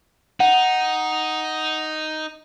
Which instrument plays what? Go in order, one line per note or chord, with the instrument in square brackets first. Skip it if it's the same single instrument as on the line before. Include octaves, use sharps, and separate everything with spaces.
[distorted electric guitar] D#4 [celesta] F#5